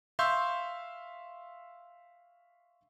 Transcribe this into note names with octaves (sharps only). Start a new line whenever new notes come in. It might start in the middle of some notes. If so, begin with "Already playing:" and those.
E5 F5 C6 C#6 E6 G6